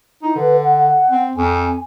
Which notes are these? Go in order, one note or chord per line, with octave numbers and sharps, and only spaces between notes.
D#4 E4
D3 B4
F#5
C4
F2 G#5